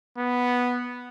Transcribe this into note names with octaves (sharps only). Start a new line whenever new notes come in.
B3